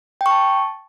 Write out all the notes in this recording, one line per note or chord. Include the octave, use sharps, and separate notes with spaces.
G5
C#6
A5